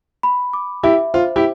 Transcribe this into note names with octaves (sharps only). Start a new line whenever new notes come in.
B5
D6
E4 G4 E5
F4 C5
E4 G4